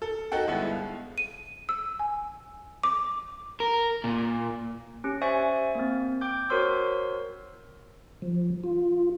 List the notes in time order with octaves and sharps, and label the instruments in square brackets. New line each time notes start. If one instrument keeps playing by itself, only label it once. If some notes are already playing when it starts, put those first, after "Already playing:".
[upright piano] A4
D#4 F#4 A4 F#5 G5
G1 D3 G#3 B3 E4
F5
[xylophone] D#7
E6
G#5
D6
[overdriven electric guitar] A#4
A#2
[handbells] C#4 G4
C5 D5 E5 G#5 C#6
A#3 C4
G5 D6 G6
F#4 A#4 C5 C#5 C6 E6
[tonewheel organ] F3
F4